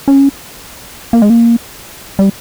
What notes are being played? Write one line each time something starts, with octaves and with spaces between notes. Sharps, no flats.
C#4
A#3
G#3
A#3
G3